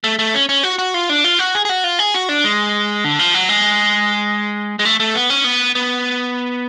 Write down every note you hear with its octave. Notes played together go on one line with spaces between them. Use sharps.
A3
A3
C#4
C#4
F#4
F#4
F4
D4
F4
F#4
G#4
G#4
F#4
F4
G#4
F#4
D4
G#3
D3
F3
F#3
G#3
G#3
A3
A3
B3
C#4
B3
B3